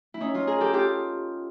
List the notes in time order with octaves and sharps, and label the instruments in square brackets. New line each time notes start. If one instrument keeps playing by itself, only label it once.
[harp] E4
C#4 D#4
D#4 F4
G#4 A#4
G4 A4
F4 G4